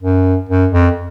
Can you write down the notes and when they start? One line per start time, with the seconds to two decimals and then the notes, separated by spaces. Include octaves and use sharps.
0.03 F#2
0.49 F#2
0.72 F2